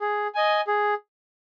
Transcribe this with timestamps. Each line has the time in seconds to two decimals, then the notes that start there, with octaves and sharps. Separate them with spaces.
0.01 G#4
0.35 D#5 G#5
0.67 G#4